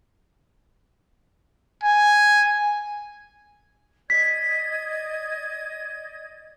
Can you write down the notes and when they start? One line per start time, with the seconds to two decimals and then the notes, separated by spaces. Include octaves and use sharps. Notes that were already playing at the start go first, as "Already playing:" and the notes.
1.83 G#5
4.10 D5 D#5 G#6 B6